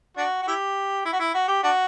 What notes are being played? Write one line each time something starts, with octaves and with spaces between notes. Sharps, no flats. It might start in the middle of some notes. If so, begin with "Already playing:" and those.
D4 F#4
F#4
E4 G4
E4
F#4
E4
F#4
G4
D4 F#4